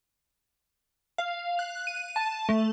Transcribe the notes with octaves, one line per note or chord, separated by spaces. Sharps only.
F5
F#6
D#7
A5
A3